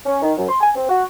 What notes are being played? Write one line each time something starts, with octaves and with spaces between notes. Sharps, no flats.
C#4
D#3
F#2
C6
G#5
C4
F#4